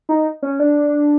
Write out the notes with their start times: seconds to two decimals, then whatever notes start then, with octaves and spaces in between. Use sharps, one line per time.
0.09 D#4
0.43 C#4
0.60 D4